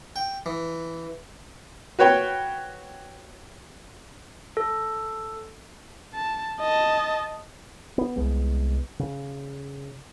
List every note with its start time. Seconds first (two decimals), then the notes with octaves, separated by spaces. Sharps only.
0.16 G5
0.46 E3
1.99 F#4 B4 C#5 G5
4.57 A4
6.14 A5
6.60 D#5 A5
7.98 B3
8.16 C2 G#3 B3
8.99 C#3